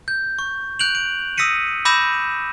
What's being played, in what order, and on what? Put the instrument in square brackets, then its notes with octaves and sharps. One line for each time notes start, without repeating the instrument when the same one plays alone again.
[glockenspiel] G6
C#6
F#6 G6 D7 F7 F#7
D7
D#6 E6 A#6 B6 C#7 D#7
B5 D6 E6 G6 A#6 E7